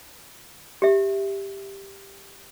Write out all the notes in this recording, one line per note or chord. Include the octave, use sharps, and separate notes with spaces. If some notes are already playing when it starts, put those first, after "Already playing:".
G4 E5